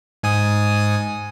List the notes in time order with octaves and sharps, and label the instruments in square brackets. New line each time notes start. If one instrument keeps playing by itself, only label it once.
[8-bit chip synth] G#2 G#5 D#6